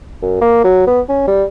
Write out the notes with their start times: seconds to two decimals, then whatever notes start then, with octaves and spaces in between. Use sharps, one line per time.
0.22 F#2
0.41 A#3
0.64 F#3
0.87 B3
1.09 C#4
1.27 G3